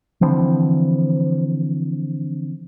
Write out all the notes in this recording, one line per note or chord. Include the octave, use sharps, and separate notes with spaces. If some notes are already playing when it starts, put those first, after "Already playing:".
D3 E3 F3 C4